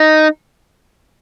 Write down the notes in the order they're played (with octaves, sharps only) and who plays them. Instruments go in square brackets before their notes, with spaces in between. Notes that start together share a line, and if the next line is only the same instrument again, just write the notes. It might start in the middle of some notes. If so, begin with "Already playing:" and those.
Already playing: [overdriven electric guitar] D#4